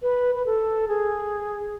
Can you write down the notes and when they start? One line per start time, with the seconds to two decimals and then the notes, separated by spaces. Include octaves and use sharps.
0.02 B4
0.35 B4
0.46 A4
0.88 G#4